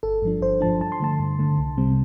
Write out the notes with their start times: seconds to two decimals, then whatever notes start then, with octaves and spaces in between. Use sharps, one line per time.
0.03 G1 A4
0.22 G2 F3 D4
0.41 G1 C5
0.61 G2 F3 D4 A5
0.81 G2 A5
0.92 C6
1.00 D3 A3 A5
1.19 G2
1.39 D3 A3
1.58 C2
1.77 C3 G3 C4